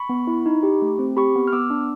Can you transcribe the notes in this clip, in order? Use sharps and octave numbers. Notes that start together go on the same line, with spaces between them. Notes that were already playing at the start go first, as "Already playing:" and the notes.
Already playing: B5 C#6
B3
E4
D#4
G4
A3
C4
G4 B5 C#6
B3
F6
B3 D6 E6
D4